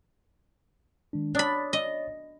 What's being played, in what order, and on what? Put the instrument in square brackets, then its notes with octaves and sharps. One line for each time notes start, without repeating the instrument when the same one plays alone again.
[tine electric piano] D#3 G#3 D4
[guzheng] D4 B5 [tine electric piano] C#5 D#6 A6
[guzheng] D#5